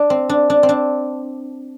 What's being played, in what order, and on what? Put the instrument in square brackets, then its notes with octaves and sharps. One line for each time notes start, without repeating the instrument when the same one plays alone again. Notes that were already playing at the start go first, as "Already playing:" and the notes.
Already playing: [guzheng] D4
C4
D4
D4
C4
D4